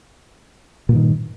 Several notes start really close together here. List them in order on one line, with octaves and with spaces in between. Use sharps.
A#2 G2 D#3